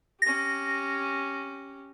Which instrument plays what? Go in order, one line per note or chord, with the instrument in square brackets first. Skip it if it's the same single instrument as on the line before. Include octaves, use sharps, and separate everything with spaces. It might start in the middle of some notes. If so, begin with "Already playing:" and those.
[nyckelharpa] C#4 G4 [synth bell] A#6